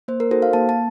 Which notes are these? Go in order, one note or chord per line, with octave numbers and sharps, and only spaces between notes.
A#3 C5
A#4
D#4 F#4 A4 C5
F5
A#3 A5
A5